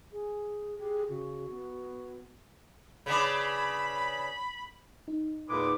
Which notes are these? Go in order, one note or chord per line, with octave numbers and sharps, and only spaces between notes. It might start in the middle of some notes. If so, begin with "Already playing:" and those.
G#4
G4 G#4
C#3 F#4
B3
C#3 B3 D4 B5
D#4
E2 A#2 G#3 B3 D6